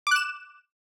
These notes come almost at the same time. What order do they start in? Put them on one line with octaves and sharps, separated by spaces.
D6 F#6 E7